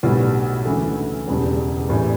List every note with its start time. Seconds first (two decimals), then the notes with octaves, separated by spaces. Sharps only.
0.03 B1 A2 G3 B3 F#4
0.65 D2 C#3 E3 A3
1.27 E1 E2 C#3 G3
1.89 A2 E3 G3 D4